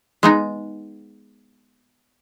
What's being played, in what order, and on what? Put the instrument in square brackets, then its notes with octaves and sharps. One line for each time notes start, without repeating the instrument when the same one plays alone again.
[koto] G#3 B3 D#4